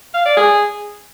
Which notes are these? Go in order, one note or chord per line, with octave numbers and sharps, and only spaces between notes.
F5
D5
G#4